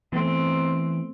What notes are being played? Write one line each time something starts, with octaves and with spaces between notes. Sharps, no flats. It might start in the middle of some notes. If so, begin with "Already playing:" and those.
E3 A3 B3 C4